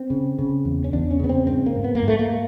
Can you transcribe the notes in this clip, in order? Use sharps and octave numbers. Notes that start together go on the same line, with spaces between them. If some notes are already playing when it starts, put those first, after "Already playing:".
Already playing: C4
C#3
C#3
E2
C#4
E2 D4
C#4
C#3 B3
C4
G#2 C4
A#3
G#2
B3
A#3
G#2
A3
A#3